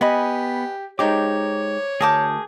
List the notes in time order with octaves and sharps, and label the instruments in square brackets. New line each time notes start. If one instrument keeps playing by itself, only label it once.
[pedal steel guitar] B3 B5 [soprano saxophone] G4 [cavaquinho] B4 D#5 G#5
[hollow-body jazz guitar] G#3 D#4 G4 [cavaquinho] C5 A#5 [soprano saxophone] C#5 [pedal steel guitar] D6
[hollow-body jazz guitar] D2 [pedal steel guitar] G#4 D#6 G6 [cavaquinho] A#4 A5 D6